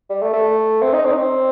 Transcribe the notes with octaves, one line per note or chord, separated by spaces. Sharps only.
G3
A3
A3
C4
D#4
C4
D#4
C4